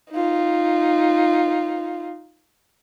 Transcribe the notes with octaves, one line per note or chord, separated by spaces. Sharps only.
D#4 F4